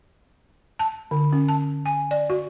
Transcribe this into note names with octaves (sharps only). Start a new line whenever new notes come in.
A5
D3
C#4
A5
G#5
D5
F#4